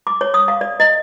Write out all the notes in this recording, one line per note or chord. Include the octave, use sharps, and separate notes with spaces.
D6
C#5
D#6
F5
D5
D#5